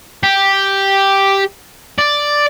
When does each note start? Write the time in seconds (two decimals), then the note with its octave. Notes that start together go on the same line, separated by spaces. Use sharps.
0.23 G4
1.98 D5